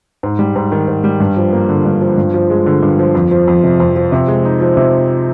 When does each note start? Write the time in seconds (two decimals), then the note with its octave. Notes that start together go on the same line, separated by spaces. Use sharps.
0.23 G#2
0.39 G3
0.56 G#2
0.72 D#3
0.88 G#2
1.04 G3
1.20 G2
1.37 F3
1.53 A#3
1.69 D3
1.85 G2
2.01 F3
2.18 G2
2.34 F3
2.50 G#3
2.66 D3
2.83 G2
2.99 F3
3.15 F2
3.31 F3
3.47 F2
3.63 C3
3.80 F2
3.96 F3
4.12 C3
4.28 G#3
4.45 D#4
4.60 F3
4.77 C3